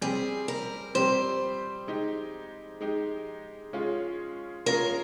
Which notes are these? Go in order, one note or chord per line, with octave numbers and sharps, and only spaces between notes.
G3 C4 G4 G#4
A#4
G3 C4 G4 C5
G#3 D#4 G4
G#3 D#4 G4
G#3 C#4 F4 G#4
G#3 C#4 F4 G#4 A#4